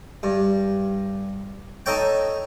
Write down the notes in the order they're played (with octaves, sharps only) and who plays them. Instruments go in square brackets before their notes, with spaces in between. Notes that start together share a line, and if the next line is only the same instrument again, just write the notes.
[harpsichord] G2
D#4 A4 C#5 G5